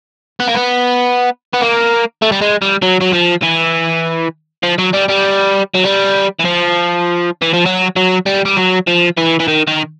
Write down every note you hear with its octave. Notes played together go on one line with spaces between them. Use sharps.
B3
A#3
B3
B3
A#3
A3
G3
G#3
G3
F#3
F#3
F3
E3
F3
F#3
G3
G3
F#3
G3
E3
F3
E3
F3
F#3
F#3
G3
G3
F#3
F3
E3
E3
D#3
D#3